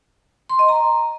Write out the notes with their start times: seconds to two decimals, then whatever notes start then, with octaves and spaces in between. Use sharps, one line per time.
0.49 C6
0.59 D#5
0.69 A#5